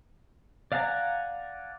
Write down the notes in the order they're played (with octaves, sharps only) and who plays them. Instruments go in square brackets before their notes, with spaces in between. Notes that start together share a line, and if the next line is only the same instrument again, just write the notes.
[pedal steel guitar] D5 F5 F#5 G#5 A#5